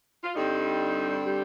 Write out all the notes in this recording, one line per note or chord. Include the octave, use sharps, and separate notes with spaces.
F4
G2 D3 G3 C4 D#4
G3 G4